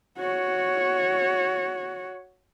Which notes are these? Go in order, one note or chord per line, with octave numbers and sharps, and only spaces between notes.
F#4 C#5